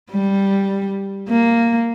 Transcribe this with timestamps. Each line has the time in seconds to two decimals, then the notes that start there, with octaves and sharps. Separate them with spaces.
0.12 G3
1.29 A#3